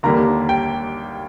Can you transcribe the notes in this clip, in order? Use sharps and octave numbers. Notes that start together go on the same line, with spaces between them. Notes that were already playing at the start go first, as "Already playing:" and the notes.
D#2 D3 G3 A#3 A#5
G5